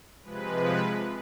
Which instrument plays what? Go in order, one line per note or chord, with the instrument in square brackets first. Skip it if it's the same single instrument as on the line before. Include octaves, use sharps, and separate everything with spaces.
[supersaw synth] C3 F3 G#3 B4